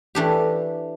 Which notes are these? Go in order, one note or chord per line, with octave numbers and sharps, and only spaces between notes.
E3 A3 D4 G4